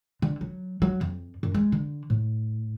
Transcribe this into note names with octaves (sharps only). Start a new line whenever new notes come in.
D3
F#3
F#3
F2
F#2
G#3
D3
A2